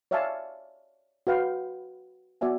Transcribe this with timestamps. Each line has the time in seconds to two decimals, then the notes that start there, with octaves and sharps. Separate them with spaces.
0.11 C#5 D5 E5 F5 G#5 A5
1.27 F#4 B4 F5 G5
2.41 B3 F#4 D5 E5 G#5